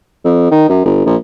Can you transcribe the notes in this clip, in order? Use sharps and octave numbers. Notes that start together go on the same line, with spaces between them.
F2
D#3
F#2
G1
A#1